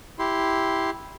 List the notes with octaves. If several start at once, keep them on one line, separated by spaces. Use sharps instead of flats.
E4 G4 C6